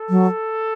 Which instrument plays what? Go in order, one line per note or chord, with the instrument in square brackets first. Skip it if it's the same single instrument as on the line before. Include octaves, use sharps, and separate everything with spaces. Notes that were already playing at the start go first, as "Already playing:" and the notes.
Already playing: [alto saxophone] A4
[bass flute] F#3